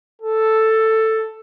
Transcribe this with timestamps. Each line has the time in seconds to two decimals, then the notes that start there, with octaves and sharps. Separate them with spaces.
0.22 A4